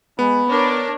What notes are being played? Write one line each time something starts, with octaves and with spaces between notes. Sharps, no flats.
G#3 B3 B5
D4 A#4 C#5